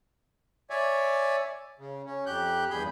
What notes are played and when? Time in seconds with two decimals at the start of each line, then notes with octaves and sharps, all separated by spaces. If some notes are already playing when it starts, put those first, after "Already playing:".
0.70 C#5 D5 E5 G#5
1.79 C#3
2.06 C#4
2.26 F2 G4 F#6 G6
2.70 E2 G2 G#4 B5 G6